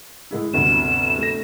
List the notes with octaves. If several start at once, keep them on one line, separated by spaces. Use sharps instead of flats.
A2 G#3 E4
G1 D2 C3 E7
A3 A#6